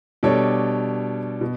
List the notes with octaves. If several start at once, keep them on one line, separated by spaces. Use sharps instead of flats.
B2 G3 D4 A4 C#5
B2